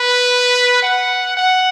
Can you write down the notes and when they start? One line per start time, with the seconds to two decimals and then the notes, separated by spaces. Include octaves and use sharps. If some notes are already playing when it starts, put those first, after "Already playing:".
Already playing: B4
0.82 F#5
1.37 F#5